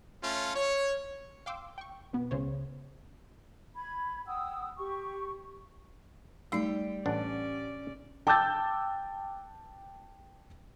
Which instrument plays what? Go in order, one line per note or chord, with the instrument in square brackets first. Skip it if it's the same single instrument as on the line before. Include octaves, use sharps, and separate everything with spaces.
[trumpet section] A3 C#4 F4
C#5
[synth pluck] F5 G5 C6 D6 E6
G5 C#6
B2 B3
C#2 C#3 C5 C#5
[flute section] B5 G#6
F#5 G5 D#6 E6
G4 C#6
[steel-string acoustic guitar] G3 G5 [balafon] A3 D#4
[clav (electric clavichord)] A1 D4 F#5 [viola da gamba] C#4 D5
[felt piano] G5 A5 D6 E6 G6 A6